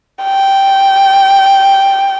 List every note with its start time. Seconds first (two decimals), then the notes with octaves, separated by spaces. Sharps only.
0.24 G5